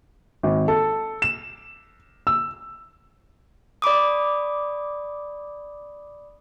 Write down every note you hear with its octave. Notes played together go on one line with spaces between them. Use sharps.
G#1
A4
E7
E6
D5 B5 D6 D#6